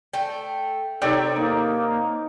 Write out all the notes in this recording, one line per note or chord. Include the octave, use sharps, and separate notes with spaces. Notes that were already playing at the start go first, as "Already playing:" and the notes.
A3 G5
C3 D#4 A4 C#5 D5 G5
A#3 D#4